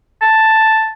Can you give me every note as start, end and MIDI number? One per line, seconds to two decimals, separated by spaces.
0.22 0.91 81